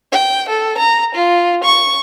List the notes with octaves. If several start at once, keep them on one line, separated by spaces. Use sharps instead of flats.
G5
A4
A#5
F4
C#6